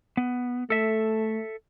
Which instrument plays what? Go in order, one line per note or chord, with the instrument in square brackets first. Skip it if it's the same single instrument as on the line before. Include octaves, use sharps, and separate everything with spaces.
[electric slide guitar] B3
[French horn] A3 [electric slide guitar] A4 E5